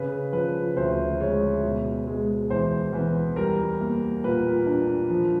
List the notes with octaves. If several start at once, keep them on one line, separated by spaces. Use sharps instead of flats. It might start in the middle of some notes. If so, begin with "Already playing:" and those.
Already playing: C#3 B4
F3 B4
D2 C5
G#3 C#5
B2
G#3
E2 C5
E2 B4
G3 A#4
A#3
A#2 B4
D4
F3